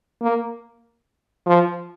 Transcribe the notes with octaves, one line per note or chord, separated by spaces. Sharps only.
A#3
F3